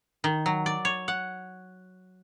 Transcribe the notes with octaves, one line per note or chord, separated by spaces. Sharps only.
D#3
F#3
D5
C#5
F#5